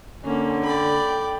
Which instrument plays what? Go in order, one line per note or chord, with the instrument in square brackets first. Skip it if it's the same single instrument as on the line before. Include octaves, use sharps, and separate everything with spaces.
[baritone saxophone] D3 [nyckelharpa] A#3 [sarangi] C#4
[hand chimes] A4 [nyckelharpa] D5 B5 [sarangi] G5